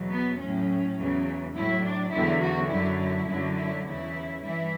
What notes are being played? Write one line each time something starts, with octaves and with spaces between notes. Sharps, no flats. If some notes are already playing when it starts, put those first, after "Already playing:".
Already playing: E2 B2 F#3
B3
A2 F#3 C#4
E2 C#3 F#3
A2 F#3 E4
D4
E2 D3 F#3 E4
F#4
F#2 D3 F#3 E4
E4
F#2 D3 F#3
E4
E2 C#3 E3 E4
G2 E3 E4